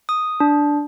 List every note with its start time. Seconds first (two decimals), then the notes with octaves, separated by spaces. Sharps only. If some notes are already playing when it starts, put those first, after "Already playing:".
0.09 D#6
0.40 D4